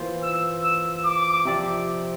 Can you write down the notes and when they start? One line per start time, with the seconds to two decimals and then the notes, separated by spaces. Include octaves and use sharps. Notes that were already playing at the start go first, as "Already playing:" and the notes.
Already playing: E3 A#3 F4 C5
0.23 E6
0.64 E6
1.05 D6
1.45 C3 F3 C4 G4 D5